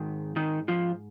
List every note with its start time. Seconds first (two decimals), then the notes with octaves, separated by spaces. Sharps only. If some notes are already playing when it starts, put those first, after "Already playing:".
Already playing: G#2 D#3
0.36 D#3 D#4
0.68 F3 F4